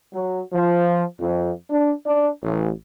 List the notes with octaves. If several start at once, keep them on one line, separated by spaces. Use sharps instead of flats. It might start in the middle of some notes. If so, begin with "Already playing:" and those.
F#3
F3
F2
D4
D4
A1